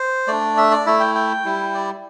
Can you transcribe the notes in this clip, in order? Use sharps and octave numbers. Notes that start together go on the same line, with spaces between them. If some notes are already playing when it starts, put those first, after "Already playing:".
Already playing: C5
A3 D4 D5
E5
D5
A3 E4 E5
G5
G5
G3 E4
D5